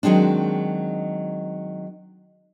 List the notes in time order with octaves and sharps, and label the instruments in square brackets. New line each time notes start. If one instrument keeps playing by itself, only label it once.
[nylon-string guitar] D#3 F#3 G#3 C4 D4